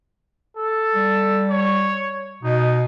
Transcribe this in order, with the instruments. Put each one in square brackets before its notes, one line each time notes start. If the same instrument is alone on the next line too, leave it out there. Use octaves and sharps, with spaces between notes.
[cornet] A4
[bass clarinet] G3
[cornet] C#5
[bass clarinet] B2 [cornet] D#4